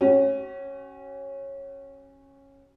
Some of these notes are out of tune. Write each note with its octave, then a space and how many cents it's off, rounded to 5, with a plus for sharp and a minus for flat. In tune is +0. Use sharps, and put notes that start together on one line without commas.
C#4 -15 F#4 +40